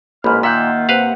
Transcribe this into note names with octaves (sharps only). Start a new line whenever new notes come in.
A1 G#2 A#3 B5 F6
A#2 D#3 F4 E5 F#5 G6
C3 B4 F5 F#5